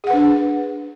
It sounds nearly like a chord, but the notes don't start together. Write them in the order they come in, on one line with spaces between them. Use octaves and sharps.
G#4 F#5 B4 D4